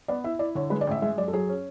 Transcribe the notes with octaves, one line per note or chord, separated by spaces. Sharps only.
B3 D5
E4 E5
E4 D5
D3 C#5
G#3 B4
D5
A1 E5
G#3 E5
F#2 D5
A4
F#3 G#4
C#4